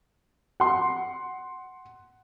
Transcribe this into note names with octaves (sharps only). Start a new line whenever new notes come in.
F#5 C6